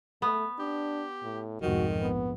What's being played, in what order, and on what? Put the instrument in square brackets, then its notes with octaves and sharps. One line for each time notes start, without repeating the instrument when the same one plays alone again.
[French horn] A3 [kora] B3
[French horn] D4 [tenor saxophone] G4
[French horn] A2
[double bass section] C2 F2 G#2 [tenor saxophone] D#3 [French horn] F#4
[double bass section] A#1 [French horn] B3